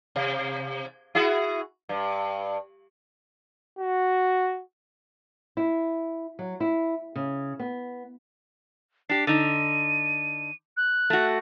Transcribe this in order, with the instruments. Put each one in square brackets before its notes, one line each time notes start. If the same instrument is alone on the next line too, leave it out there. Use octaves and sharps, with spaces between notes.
[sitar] C3
E4 F#4 G#4
G2
[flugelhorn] F#4
[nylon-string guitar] E4
F#3
E4
C#3
B3
[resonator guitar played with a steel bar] D4 G4 [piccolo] C7
[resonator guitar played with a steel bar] D3 D#4 [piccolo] D#7
[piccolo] F#6
[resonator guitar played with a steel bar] A3 F#4